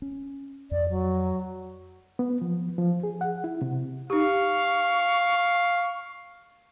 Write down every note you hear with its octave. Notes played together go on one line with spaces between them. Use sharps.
C#4
F2 D5
F#3
B3
F3
F3
G#4
F#5
E4
C3
D#4 G4 F5 C#6